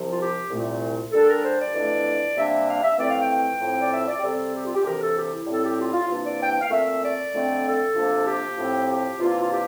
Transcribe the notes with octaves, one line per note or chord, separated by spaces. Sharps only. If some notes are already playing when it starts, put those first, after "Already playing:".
Already playing: C2 C3 F3
F4
G4
C2 A#2 A3
A#2 G3 D4 A4
A#4
C5
D5
F2 E3 A3 D4
C3 G3 A#3 D4 E5
F5
E5
F2 E3 A3 C4 D5
F5
G5
G5
A2 F3 C4
D5
E5
D5
G4
C3 G3 C4 A4
G4
F4
G4
D2 C3 E3 A#4
A4
G4
E4
A2 G3 C4 A4
G4
F4
F4
C3 E3 A#3 D4
D5
G5
G5
F5
A#2 A3 C4 E5
D5
F2 D3 A3 C4
A4
C3 F3 A#3 D4
G4
A2 F3 C4
G4
C3 E3 A#3 D4 F4
F4
G4